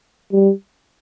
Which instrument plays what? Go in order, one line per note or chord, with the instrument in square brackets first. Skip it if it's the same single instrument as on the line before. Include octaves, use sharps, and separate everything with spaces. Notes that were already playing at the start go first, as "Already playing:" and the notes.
[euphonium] G3